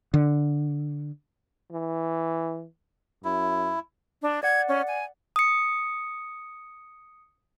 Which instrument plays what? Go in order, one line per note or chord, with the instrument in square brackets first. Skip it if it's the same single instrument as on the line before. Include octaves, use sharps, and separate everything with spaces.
[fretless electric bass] D3
[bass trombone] E3
[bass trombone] F#2 [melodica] E4
[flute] D4
[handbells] D5 F#5 [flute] G#6
[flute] C#4
G#5
[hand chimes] D#6 C#7